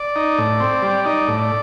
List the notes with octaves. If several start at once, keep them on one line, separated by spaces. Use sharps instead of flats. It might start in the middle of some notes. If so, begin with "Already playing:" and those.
Already playing: D5
D#4
A2
C4
G3
D#4 D5
A2
D5